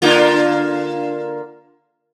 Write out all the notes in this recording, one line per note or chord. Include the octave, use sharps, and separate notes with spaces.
D3 A#3 F4